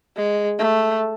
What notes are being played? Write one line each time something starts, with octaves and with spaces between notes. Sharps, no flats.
G#3
A3